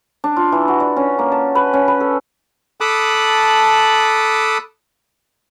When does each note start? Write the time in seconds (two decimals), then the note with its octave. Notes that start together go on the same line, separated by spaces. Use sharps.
0.24 D4
0.36 F4
0.52 E3
0.68 F#4
0.80 D5
0.96 C#4
1.19 A#3
1.32 A5
1.55 B4
1.73 C#4
1.88 B4
2.00 A4
2.81 A4 A5 B5 D6 D#6 F#6